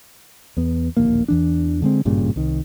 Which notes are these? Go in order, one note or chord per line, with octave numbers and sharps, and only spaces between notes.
E2 B3
D1 A#1 D#2 A#3
E2 E3 D4
D3 G#3 C4
G#1 G2 A#2 C#3
C2 D#3